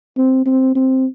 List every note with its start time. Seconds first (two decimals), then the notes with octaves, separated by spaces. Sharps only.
0.17 C4
0.46 C4
0.75 C4